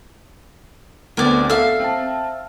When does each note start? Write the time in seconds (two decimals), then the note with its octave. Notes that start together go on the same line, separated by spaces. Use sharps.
1.17 D2 B3 C4 A#4 D5
1.50 A4 E5 F5
1.80 C4 A5